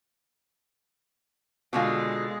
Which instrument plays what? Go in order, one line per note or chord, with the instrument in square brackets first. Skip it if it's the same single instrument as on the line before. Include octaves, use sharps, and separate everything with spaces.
[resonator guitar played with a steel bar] B2 D3 F4 [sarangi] G#3